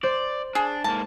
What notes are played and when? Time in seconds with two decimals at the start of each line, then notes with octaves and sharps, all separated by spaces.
0.03 C5 D5
0.55 D4 G#4
0.84 G#2 A#3 A5